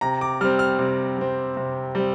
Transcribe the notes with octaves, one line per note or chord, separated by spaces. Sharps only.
C3 A#5
D6
G3 C4 F6
F6
C3
G3 C4
C3
G3 C4